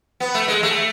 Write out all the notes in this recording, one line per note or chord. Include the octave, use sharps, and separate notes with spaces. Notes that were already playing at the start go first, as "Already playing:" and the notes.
B3
A3
G#3
A3